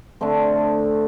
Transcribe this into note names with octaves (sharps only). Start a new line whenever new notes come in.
D3 A3 C4